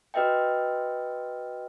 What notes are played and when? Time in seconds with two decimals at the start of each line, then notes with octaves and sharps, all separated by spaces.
0.14 F#4 B4 D#5 E5 G5